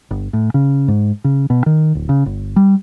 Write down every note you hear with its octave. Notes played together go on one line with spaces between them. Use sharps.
G1
A2
C#3
G#2
C#3
B2
D#3
D1
C#3
G1
G3